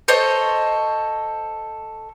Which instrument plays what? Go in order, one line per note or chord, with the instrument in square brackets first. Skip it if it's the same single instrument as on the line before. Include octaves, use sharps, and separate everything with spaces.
[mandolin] A4 C5 C#5 D#5